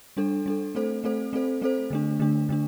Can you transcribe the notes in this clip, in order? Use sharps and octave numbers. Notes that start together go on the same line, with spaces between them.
G3 D4 A4
G3 D4 A4
A3 C4 A4 C5
A3 C4 A4 C5
A3 C4 A4 C5
A3 C4 A4 C5
D3 A3 D4
D3 A3 D4
D3 A3 D4